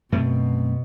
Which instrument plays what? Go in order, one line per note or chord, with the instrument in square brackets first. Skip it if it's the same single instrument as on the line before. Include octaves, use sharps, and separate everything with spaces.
[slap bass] F#2 A3 C4 [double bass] B2